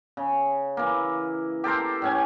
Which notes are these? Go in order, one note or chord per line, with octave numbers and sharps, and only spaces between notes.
C#3
E3 A#3
G4 A4 A#4 C5
A2 C#4 G#5